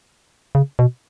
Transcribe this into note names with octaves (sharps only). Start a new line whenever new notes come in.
C#3
B2